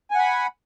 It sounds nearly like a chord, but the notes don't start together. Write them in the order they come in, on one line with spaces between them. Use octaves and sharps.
G#5 F#5 B5